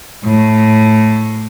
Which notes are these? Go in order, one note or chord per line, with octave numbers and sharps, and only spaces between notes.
A2